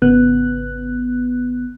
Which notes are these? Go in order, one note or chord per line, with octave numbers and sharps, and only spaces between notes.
G#1 C#3 B3 F#6